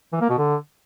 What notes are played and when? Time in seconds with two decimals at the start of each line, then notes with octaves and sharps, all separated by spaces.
0.13 E3
0.21 A#3
0.30 B2
0.38 D3